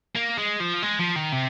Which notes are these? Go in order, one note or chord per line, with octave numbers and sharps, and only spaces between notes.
A#3
G#3
F3
G#3
F3
D#3
C3